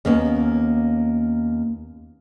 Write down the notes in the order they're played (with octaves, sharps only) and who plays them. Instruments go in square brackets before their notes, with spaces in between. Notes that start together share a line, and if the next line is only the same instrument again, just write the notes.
[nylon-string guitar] D#2 A#3 B3 C#4